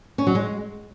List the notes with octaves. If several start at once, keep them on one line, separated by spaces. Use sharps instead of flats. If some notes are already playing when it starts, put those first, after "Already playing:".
C#4
F#3
G#3